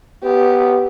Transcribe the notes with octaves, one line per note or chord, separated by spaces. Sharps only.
B3 G4